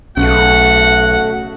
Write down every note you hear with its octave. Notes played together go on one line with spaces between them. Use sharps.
B1 C#3 A3 C#4 F#4 F#5